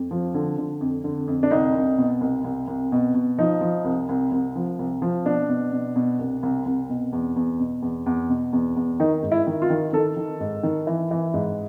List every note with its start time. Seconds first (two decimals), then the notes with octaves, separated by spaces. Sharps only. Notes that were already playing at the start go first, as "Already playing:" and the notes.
Already playing: F2
0.11 F3
0.35 D3
0.58 D3
0.81 F2
1.04 D3
1.27 F2
1.43 D4
1.51 C2 D#4
1.75 C2
1.98 B2
2.21 C2
2.44 C2
2.67 C2
2.92 B2
3.14 B2
3.38 F3 D#4
3.61 F3
3.85 C2
4.09 C2
4.32 C2
4.56 F3
4.79 C2
5.02 F3
5.25 B2 D4
5.49 B2
5.72 B2
5.96 B2
6.19 C2
6.43 C2
6.66 C2
6.90 B2
7.13 E2
7.36 E2
7.60 B2
7.82 E2
8.06 E2
8.29 B2
8.53 E2
8.76 E2
9.00 D#3 D#4
9.23 G#2
9.32 E4
9.47 D#3
9.62 F4
9.70 D#3
9.93 D#3 A4
10.16 D#3
10.40 G#2
10.63 D#3
10.87 E3
11.11 E3
11.34 G#2